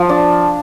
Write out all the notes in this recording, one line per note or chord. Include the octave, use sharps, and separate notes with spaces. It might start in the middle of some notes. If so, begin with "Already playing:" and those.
Already playing: F3
D4